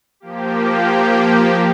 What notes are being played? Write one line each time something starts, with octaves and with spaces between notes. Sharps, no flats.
F3 A#3 G4